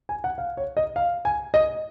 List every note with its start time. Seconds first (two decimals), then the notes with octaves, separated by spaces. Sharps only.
0.09 G#5
0.24 F#5
0.38 F5
0.57 C#5
0.77 D#5
0.96 F5
1.25 G#5
1.54 D#5